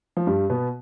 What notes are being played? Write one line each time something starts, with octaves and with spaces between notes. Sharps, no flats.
F3
G2 G3
B2 B3